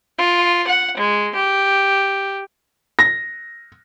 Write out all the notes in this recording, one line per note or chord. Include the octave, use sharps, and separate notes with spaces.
F4
F#5
G#3
G4
A#6